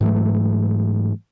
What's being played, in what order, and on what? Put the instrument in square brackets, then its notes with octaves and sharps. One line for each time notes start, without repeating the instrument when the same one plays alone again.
[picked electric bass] G#2 E3 F#3 A3